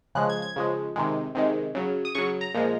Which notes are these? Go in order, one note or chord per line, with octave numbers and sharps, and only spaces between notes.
C#3 F3 G#3 F#6
G#6
G#6
C#3 F3 G#3
C3 D#3 G#3
C3 D#3 G#3
C#3 F#3
D#6
C#3 F#3 C#6
A#5
A#2 F3 G#3